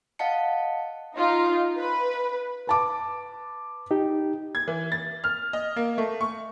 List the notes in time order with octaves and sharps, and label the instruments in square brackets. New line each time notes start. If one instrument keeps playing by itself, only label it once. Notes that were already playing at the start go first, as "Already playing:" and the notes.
[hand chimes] D#5 F5 F#5 A5 C#7
[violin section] D#4 F4
B4
[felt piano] B4 A5 D6
[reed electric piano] D#4 G4
[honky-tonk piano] G#6
E3
A6
F6
D#5
A#3
A3
C#6